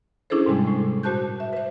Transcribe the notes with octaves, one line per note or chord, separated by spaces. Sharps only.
C#4 D4 E4 G#4 A4 C5
G#2 C3 G3 G#3
A2
A#2 F#4 C5 A5 F#6 G6
E5
B4 C5